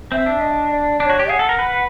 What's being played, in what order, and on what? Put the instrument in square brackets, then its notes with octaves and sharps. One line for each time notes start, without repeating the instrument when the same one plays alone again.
[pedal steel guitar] C4 [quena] E5
[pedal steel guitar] D4
[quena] D#5
D5
[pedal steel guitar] D4 [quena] D5
[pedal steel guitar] F#4 [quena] C#5
[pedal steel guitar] G4
[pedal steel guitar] G#4 [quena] F#5
[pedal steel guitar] A4
A#4
B4